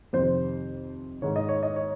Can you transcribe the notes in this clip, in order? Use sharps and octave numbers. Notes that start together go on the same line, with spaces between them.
F2 C3 D#3 C5
G#2 D#3 C#5
D#5
C#5
D#5
C#5